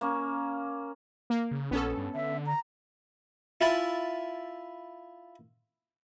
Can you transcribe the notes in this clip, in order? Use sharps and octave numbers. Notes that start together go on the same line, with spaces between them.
A#3 C#4
A#3
C#3
A#1 B3 C#4 A4
G2
D3 E5
A#5
E4 F4 E5 G#5 A5 B5